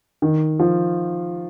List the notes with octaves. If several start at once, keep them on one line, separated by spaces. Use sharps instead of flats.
D#3
F3